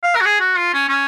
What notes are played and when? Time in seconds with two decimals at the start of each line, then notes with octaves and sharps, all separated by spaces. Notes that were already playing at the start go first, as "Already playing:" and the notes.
0.03 F5
0.15 A#4
0.21 F#4
0.25 G#4
0.40 F#4
0.57 F4
0.73 C#4
0.89 C#4